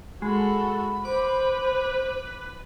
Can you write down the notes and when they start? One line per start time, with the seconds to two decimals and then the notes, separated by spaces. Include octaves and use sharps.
0.22 G#3 F#4 A4 B5
1.05 B4 C5 D6